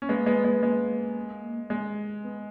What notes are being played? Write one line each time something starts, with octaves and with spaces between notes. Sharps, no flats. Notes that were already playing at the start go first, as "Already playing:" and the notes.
C#4
G#3 A#3 B3
G#3 B3
G#3 B3
G#3
G#3
B3